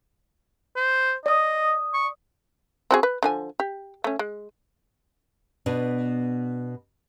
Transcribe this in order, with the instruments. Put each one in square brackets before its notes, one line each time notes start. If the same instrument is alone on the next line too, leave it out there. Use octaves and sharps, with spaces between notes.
[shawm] C5
[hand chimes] D5 D#6 [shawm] D#5
[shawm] C#6
[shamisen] C4 F#4 G#4
B4
D3 F3 G#5
G4
A3 C#4
G#3
[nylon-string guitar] B2 B3 D4